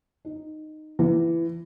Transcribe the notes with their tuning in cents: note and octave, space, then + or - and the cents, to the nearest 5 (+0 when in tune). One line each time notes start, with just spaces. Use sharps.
D#4 -10
E3 +20